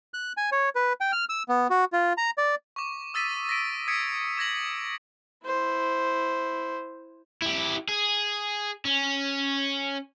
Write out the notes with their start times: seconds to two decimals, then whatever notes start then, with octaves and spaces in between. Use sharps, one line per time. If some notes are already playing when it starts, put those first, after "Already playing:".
0.14 F#6
0.37 G#5
0.52 C#5
0.75 B4
1.01 G5
1.12 F6
1.29 E6
1.49 B3
1.70 F#4
1.93 F4
2.17 A#5
2.38 D5
2.76 C#6 D6
3.14 D#6 E6 A6 B6 D#7
3.49 A#6 B6 D7
3.88 D#6 G#6 B6 C#7 D7
4.37 D6 G#6 A#6 F#7
5.46 E4 C5
7.42 E4 G4
7.88 G#4
8.85 C#4